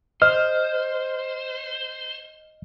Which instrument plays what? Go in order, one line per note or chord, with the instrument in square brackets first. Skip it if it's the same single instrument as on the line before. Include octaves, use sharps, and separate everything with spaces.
[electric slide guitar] C5 [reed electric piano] D#5 F6